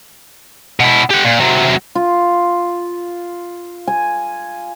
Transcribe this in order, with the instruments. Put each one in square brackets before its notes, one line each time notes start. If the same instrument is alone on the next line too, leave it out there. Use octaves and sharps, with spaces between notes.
[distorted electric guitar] B2 E4
G4 F#5
A#2
C3 F#3
[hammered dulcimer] F4
G#5